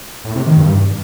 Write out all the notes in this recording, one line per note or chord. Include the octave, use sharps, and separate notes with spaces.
A2
C3
D#3
G2